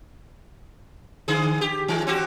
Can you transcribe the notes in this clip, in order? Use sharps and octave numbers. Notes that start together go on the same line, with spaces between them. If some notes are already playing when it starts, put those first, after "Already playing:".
D3 G#4
G4
D#3 G#3
C4 F#4 G4